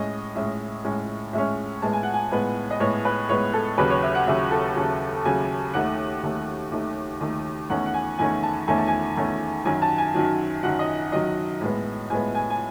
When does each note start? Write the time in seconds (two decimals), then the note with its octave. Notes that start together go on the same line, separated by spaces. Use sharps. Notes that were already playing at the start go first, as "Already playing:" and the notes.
Already playing: A2 G#3 C#4 D#5
0.35 A2 G#3 C#4 E5
0.84 A2 G#3 C#4
1.33 A2 G#3 C#4 E5
1.82 A2 G#3 B3 A5
1.93 G#5
2.03 F#5
2.14 G#5
2.31 A2 G#3 B3
2.71 D#5
2.80 A2 G#3 B3 C#5
3.05 B4
3.29 A2 G#3 B3 C#5
3.53 A4
3.78 D#2 C#3 F#3 B4
3.90 C#5
4.02 E5
4.15 F#5
4.27 D#2 C#3 F#3 E5
4.51 A4
4.76 D#2 C#3 F#3
5.25 D#2 C#3 F#3 G#5
5.74 D#2 D#3 A3 F#5
6.23 D#2 D#3 A3
6.71 D#2 D#3 A3
7.20 D#2 D#3 A3
7.70 E2 D#3 A3 C#4 F#5
7.86 F#5
7.94 G#5
8.18 E2 D#3 A3 C#4 G#5
8.43 A5
8.67 E2 D#3 A3 C#4 G#5
8.78 A5
8.87 G#5
9.17 E2 D#3 A3 C#4
9.65 F#2 D#3 F#3 G#5
9.82 A5
9.98 G#5
10.14 F#2 D#3 F#3
10.63 F#2 D#3 F#3 F#5
10.79 D#5
11.12 F#2 D#3 F#3 D#5
11.61 A2 G#3 B3
12.10 A2 G#3 B3 G#5
12.35 G#5
12.50 G#5